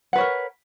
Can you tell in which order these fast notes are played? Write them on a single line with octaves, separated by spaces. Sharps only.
F#5 B4 C#5 A#4